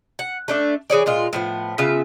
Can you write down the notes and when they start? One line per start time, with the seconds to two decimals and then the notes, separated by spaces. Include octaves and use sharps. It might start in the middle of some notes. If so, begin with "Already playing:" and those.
0.19 F#5
0.48 A3 D4 E5
0.90 E3 G#4 C#5 D5
1.06 A#2 G#3 F4
1.33 A2 F3 B3
1.78 C#3 B3 F4 E5